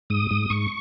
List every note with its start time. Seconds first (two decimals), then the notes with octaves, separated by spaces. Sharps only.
0.10 G#2 D#6
0.31 G#2
0.50 G#2 C#6